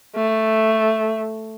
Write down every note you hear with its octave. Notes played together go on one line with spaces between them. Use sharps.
A3